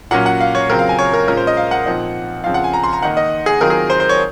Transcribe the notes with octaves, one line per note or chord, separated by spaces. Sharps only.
A#2 F#3 A#3 C#4 F4 F#5
F#5
F5
C#5
C#3 F#3 C4 F4 A#4
F5
G#5
C#5
A#4
A#2 G#3 C#4 F4 A#4
C5
D#5
F5
F#5
A#2 F3 C4 D#4
C#3 F3 C4 F4 F5
F#5
G#5
A#5
C6
A#5
D#3 A#3 D#4 F#5
D#5
G#4
D#3 F#3 C4 F4 A#4
G#4
C5
C5
C#5